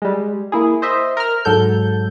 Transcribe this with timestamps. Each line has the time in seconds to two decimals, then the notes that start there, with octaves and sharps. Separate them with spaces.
0.02 G3 G#3
0.52 A#3 E4 G#4
0.82 C5 D#5 E5
1.17 A#4 F6
1.45 G#2 F#3 A4 G6